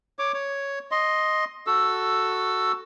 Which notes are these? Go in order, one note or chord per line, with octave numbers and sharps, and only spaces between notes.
C#5 D6
C#5
D#5 C6
F#4 A4 E6